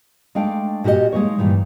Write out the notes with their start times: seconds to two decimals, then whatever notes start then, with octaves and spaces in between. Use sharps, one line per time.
0.35 G#3 A3 D4 F5 G5
0.84 A#2 F#4 G4 A4 D#5
1.12 G#3 A#3 D#4 C#5
1.38 G2 A#2 D#3 E3